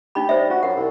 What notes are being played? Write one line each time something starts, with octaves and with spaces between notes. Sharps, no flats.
D#4 G4 B5
G3 C5 E5
F4 F#4
F#2 F#5
C2